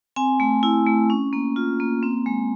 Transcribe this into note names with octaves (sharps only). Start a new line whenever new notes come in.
C4 G#5
A3
E4
A3
C#4
A#3
F4
A#3
C4
G#3